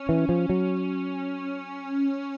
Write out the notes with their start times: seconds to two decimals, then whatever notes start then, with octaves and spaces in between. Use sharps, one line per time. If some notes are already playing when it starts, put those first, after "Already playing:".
Already playing: C#4
0.09 E3
0.29 F3
0.49 F#3